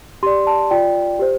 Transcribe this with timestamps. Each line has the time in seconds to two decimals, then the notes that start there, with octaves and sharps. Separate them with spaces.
0.23 G4 C6
0.26 D5
0.47 A5
0.71 F4 D5 G5
1.19 G4 C5